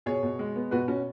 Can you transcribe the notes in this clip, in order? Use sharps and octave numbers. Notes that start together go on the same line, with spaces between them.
B2 G#4 C#5
B2
G#3
B3
B2 F#4 B4
B2 C#4 F#4